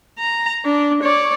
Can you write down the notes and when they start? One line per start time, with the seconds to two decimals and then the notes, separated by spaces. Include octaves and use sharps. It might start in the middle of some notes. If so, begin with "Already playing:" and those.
0.19 A#5
0.65 D4
1.03 C#5 D5